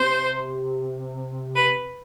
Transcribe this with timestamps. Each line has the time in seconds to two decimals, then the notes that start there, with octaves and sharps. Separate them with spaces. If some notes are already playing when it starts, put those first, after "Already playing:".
Already playing: C3 C5
1.56 B4